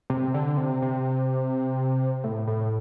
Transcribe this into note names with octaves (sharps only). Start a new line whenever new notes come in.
C3
D3
C3
C3
A2
A2